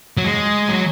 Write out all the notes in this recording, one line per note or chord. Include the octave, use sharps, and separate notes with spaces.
F#3
G#3
F#3